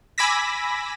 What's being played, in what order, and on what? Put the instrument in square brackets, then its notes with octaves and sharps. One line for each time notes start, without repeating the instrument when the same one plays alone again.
[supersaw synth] G#5 B5 D6 E6 A#6 B6